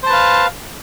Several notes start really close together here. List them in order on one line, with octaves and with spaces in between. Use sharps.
C5 A5 B4 F5